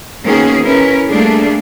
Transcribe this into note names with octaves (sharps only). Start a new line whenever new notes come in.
D#3 A#3 B3 C#4 F#4 G#4
C#4 E4 A#4 B4
G3 A3 A#3 D4 G#4 A4